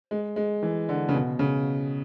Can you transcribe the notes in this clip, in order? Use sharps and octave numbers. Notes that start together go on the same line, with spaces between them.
G#3
G#3
E3
D3
C#3
B2
C#3